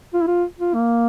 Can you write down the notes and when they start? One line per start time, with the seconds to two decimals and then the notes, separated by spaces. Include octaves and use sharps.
0.14 F4
0.21 E4
0.27 F4
0.59 F4
0.74 A#3